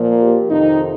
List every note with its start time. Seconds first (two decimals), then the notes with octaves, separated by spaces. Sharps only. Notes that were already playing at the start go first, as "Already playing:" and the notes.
Already playing: A#2 F3 A#3
0.21 G4
0.49 F2 C3 D#3 D#4